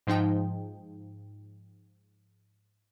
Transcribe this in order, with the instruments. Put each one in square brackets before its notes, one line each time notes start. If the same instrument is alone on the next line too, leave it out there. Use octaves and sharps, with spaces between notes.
[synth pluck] G#2 F3 D#4 G5